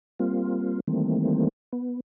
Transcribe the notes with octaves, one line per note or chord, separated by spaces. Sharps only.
G3 A#3 C4 F4
D#3 E3 G3 A3 A#3 C4
B3